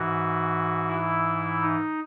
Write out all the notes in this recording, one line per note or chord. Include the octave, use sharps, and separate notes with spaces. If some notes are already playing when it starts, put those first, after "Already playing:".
Already playing: G#2 E3 F#4
E4
D#4